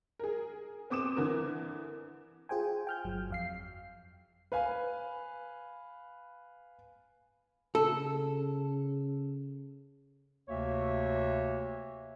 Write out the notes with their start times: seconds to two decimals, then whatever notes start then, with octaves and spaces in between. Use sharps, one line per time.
0.19 G#4 A#4
0.90 B3 C4 D6 D#6 E7
1.16 D3 E3 A#4
2.49 F4 G#4 C5 G5 G#5
2.87 G5 F6 G6
3.04 G1 F#3
3.30 F2 F5 C7
4.52 B4 F5 G#5 B5
7.75 C#3 A4
10.49 D2 C3 A#3 C#5 E5